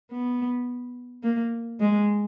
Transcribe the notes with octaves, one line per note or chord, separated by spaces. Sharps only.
B3
A#3
G#3